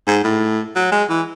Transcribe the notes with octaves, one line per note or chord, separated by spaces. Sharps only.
G#2
A2
F#3
G#3
E3